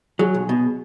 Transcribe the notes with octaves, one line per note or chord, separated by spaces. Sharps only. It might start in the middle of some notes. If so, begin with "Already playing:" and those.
F#3 G#4
B1
B2